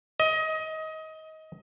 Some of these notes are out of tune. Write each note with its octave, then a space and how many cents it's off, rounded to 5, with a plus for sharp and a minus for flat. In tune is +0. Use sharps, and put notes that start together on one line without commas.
D#5 +25